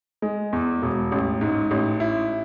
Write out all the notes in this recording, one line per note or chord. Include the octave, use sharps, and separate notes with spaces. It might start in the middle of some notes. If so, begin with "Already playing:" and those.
G#3
E2
E1
A1
G#2
A1
E4